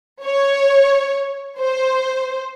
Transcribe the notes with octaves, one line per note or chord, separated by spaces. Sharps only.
C#5
C5